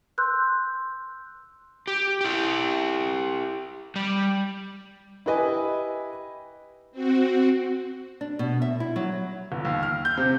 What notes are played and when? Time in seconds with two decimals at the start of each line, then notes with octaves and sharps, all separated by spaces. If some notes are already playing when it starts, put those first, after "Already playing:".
0.18 C6 E6 F#6 G6
1.88 G4
2.21 E4 G4
3.96 G3
5.26 E4 G4 B4 D#5 G#5 B5
6.91 C4 F#4
8.21 D4
8.39 B2
8.62 E5
8.80 E4
8.96 F#3
9.52 G1
9.65 D#2
9.83 F6
10.05 G6
10.17 C3